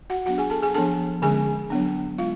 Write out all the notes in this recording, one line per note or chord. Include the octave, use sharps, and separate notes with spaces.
F#4 F#5
F#3 B3 D4 F#4 F#5
G#4 G#5
A4 A5
G#4 G#5
F3 B3 D4 A4 A5
D3 G#3 C#4 G#4 G#5
F#3 B3 D4
G#3 F4 F5